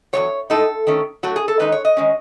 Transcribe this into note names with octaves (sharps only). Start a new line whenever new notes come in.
E2 C#3 F#3 C#5
A2 G#3 D#4 A4
D#3 A3 C#4
A2 F#3 A3 F#4
G#4
A4
D#3 G#3 D#4 B4
C#5
D#5
D#3 G#3 C#4